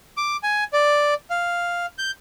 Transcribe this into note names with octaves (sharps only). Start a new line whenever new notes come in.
D6
G#5
D5
F5
G6